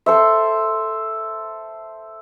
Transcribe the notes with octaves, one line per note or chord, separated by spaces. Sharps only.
A4 C5 E5